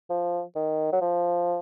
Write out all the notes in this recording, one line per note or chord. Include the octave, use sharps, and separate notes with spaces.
F3
D#3
F#3
F3